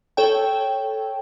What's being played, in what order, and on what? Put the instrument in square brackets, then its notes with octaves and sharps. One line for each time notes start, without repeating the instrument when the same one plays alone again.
[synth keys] A4 C#5 G5